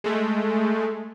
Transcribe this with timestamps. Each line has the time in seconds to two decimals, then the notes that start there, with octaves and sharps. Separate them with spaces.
0.04 G#3 A3